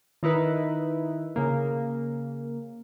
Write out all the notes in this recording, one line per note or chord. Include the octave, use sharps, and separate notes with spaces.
D#3 D#4 E4 B4
C#3 A#3